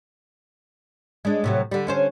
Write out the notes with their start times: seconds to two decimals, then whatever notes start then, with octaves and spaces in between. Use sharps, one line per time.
1.25 G#3 D4
1.44 A2 C3 F#3
1.71 D3 G3
1.87 D3 C#4 C5